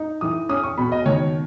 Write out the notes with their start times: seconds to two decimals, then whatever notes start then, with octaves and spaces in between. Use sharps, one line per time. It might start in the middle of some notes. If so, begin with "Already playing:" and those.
Already playing: D#4
0.21 E3 D#6
0.49 C#4 D#6
0.63 C#6
0.78 B2 B5
0.92 D#5
1.06 D#3 C#5